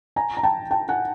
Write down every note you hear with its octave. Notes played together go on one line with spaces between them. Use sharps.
G#5 A#5
A#5
G5 A5
G5 A5
F#5 G#5